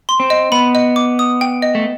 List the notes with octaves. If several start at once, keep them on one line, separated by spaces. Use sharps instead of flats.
C6
C4
D#5
B3 B5
D#5
D6
D#6
G5
D#5
A3